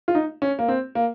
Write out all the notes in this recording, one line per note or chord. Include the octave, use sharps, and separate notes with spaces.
F4
D#4
C#4
A#3
C4
A#3